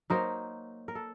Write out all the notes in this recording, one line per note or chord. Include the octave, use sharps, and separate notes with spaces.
F#3 A#3 D#4 A#4 C5
A#4
A4